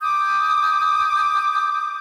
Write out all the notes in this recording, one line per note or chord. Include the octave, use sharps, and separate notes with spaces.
D6 D#6 G6